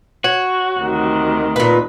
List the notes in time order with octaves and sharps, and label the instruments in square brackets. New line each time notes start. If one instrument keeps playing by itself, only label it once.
[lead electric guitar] F#4 [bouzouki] C#5
[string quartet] D2 C3 D#3
[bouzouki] A#2 B4